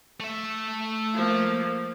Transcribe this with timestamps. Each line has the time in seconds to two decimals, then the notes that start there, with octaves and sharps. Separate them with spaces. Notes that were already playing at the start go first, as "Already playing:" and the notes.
0.20 A3 E5
1.14 F3 A#3